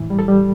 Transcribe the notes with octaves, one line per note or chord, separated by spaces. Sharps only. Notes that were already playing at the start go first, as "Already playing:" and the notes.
Already playing: A2 E3
G3
A4
G3